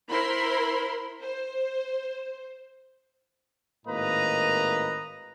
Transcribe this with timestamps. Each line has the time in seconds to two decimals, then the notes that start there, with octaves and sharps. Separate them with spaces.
0.10 E4 A#4 C5 B5 C6
1.21 C5
3.86 G#1 A2 A#3 B4 D#5 A#5